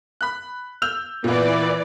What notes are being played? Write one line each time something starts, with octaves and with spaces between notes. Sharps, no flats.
B5 F#6
E6 G6 F7
A#2 E3 B3 D5